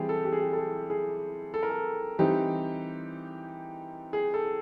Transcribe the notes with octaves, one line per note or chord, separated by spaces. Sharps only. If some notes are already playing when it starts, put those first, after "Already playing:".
Already playing: E3 G3 C4 G4 G#4
A4
G4
G#4
G4
A4
G#4
G#4
A4
A#4
A4
E3 G3 C4 D#4 G4
G#4
A4